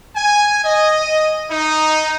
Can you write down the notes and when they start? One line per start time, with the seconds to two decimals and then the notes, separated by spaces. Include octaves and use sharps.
0.16 G#5
0.64 D#5
1.50 D#4